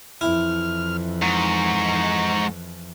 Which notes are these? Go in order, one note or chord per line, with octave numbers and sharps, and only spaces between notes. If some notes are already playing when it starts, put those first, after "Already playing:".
F2 E3 E4 F6
G#2 A#5 C#6